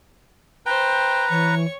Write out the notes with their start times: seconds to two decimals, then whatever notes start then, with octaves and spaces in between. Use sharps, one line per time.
0.66 B4 C5 G5 A#5
1.30 E3 C#5 C#6